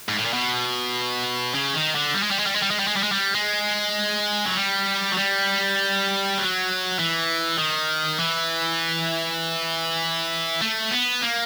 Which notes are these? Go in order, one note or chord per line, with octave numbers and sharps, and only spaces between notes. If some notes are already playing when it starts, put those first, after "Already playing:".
G#2
A2
A#2
B2
C#3
D#3
D3
G3
G#3
G3
G#3
G3
G#3
G3
G#3
G3
G#3
G3
G#3
G3
G#3
F#3
G3
F#3
G3
F#3
E3
D#3
E3
A3
B3
A#3